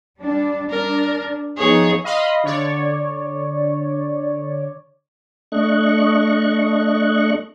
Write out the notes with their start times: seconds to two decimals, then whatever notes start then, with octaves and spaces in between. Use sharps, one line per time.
0.17 G3 D4
0.71 D4 A#4
1.57 F3 B3 D#4 G#4 C#5
2.04 D#5 F5 B5 C6
2.43 D3 C#5 D5
5.52 A3 D4 D#5 C#6 F#6